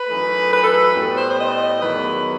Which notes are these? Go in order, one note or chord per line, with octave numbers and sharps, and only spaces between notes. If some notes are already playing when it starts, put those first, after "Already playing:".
Already playing: B4
F#2 E3 A3 D#4
B4
A4
B4
A2 G3 B3
C5
C5
D#5
E2 D#3 F#3 B4